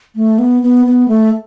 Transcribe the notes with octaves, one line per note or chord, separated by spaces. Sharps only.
A3
B3
B3
B3
A3